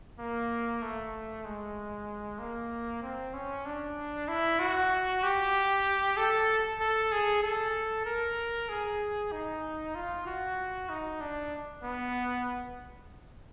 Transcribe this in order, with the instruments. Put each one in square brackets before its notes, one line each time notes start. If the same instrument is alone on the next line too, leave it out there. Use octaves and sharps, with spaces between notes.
[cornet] A#3
A3
G#3
A#3
C4
C#4
D4
E4
F#4
G4
A4
A4
G#4
A4
A#4
G#4
D#4
F4
F#4
D#4
D4
B3